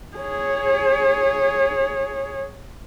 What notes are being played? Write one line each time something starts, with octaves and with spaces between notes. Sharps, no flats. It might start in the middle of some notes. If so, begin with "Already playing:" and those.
G#4 C#5